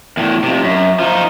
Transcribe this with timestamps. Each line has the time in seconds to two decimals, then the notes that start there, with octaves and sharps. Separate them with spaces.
0.17 E2 A2
0.44 F2 C3
0.64 F#2
0.99 F3 D#4